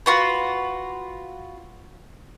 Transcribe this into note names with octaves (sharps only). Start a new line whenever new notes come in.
F4 F#4 B4